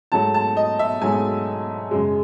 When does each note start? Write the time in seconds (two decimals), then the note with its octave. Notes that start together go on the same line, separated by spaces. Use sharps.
0.12 G#2 F#3 A3 A5
0.34 A5
0.57 D#5
0.79 E5
1.01 G#2 F#3 A3 G#5
1.91 F#2 C#3 G#3